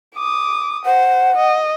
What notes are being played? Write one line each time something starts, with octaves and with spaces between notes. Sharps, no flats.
D6 D#6
C5 F#5
D#5